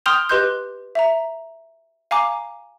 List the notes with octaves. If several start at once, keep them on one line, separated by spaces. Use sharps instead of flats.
G5 C6 D#6 F6 G6 F7
G4 B4 D#5 C6 F#6 G6
E5 A#5
F5 G#5 A#5 D6